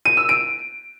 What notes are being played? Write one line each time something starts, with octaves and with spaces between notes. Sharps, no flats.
D#7
E6
D7